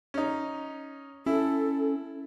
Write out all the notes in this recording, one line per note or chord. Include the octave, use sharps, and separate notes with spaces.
C#4 D#4
C#4 E4 A4